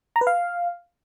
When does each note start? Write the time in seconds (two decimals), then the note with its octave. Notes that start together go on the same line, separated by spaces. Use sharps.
0.16 A#5
0.21 B4
0.27 F5